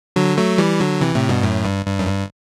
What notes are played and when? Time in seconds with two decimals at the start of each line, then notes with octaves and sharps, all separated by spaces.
0.16 D3 F#3
0.38 F#3 A3
0.58 E3 G3
0.80 D3 F#3
1.01 C3 E3
1.15 A2 C3
1.29 G2 B2
1.43 F#2 A2
1.65 G2
1.86 G2
1.99 F#2
2.07 G2